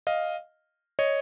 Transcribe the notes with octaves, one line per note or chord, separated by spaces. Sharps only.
D#5 F5
C#5 D#5